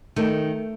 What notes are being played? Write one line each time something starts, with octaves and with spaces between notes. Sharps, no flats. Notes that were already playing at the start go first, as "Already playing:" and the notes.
D#3 A3